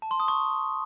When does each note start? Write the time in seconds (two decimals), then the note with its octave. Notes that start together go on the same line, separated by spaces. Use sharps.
0.02 A5
0.11 C6
0.20 D#6
0.28 C#6